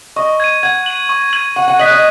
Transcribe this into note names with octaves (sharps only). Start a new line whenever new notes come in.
D#5 C#6
G#6 D#7
F#5 G#6
D#7 F#7
C#6
G#6 D#7 F#7
F#5 C#6
F#5
D#5 F#6 B6 F#7
D#5